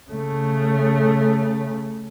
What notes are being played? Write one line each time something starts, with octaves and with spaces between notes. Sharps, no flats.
C#3 A3